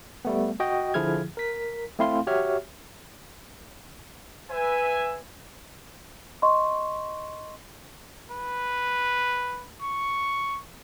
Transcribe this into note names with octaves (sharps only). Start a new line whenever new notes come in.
G3 A3 B3
F#4 D#5 G5
D3 F3 E4 G#4 F6 G#6
A#4 B6
A3 C4 E4 F5 C6
F#4 G4 C#5 E5 F6
B4 E5 G#5
D#5 C6 C#6
B4
C#6